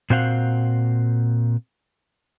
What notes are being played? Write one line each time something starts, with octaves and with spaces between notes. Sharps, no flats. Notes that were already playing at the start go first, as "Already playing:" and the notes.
A#2 C4 F#4 C5 F5 F#5